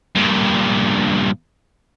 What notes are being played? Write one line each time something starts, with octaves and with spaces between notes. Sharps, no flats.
G2 A#2